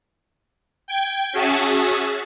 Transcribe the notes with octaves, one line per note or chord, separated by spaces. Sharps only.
G5 G#6
C#4 F#4 G#4 E5 A5